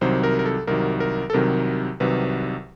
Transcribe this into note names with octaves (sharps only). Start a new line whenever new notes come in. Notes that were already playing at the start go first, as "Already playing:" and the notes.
C2 C3 D#3 F#3 C5
A#4
A#4
A4
C2 C3 D#3 F#3 A#4
A#4
A4
C2 C3 D#3 F#3 A#4
C2 C3 D#3 F#3 B4